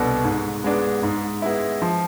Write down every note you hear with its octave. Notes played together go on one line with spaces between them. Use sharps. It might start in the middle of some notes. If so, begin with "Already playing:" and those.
Already playing: C2 B2 B3 D4 A4
G#2
G#3 B3 D4
G#2
G#3 B3 E4
F3